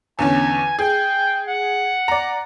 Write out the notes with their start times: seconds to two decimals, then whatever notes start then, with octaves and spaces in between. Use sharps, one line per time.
0.19 E2 D3 C#4 G#5
0.79 G#4 G5
1.48 F#5
2.08 D5 A#5